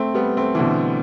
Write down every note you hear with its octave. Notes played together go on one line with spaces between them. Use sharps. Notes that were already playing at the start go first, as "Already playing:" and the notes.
Already playing: A3 C4
G3 B3
A3 C4
E3
B2 D3